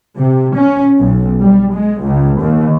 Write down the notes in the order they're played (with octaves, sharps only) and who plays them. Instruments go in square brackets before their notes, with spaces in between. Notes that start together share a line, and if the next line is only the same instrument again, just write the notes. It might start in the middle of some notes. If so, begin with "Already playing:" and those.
[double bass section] C3
C#4
B1
G3
G#3
C#2
D#2